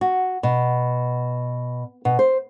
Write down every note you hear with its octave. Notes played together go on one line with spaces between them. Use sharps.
F#4
B2
B2
C5